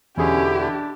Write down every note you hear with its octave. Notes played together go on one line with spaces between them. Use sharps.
E2 B2 D3 C#4 E4 G4 G#4
D4